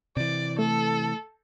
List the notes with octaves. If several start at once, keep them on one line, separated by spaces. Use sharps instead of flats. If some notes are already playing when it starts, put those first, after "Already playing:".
C3 E3 D5
A3 A4